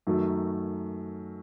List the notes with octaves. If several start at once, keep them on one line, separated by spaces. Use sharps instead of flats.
F#2 D#3 F#3 A3